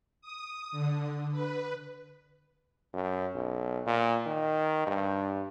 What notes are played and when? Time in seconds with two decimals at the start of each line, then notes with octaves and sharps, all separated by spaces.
0.21 D#6
0.72 D3
1.31 B4
2.94 F#2
3.35 B1
3.87 A#2
4.26 D#3
4.87 G2